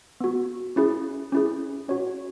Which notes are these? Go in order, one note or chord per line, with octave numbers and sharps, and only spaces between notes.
B3 F#4
C#4 E4 G#4
C#4 E4 G#4
C#4 F#4 C#5